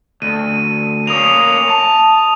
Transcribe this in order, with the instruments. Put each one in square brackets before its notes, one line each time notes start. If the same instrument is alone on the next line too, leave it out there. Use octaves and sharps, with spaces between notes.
[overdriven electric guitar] D2 [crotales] D#7
[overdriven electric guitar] A#3 C#4 [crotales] D#6 F7
[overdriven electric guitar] A5